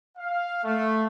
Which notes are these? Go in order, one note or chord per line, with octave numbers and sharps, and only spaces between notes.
F5
A3